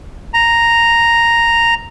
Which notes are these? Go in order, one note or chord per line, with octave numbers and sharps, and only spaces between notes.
A#5